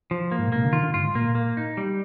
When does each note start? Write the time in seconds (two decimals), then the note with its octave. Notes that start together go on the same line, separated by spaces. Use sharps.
0.11 F3
0.32 A#3
0.39 G#2
0.48 A#2
0.52 C3 A#3
0.65 D3
0.73 D#3 F4
0.84 D3
0.94 G2 F4
1.05 G#2
1.15 A#2 A#3
1.35 A#3
1.57 D#4
1.77 G3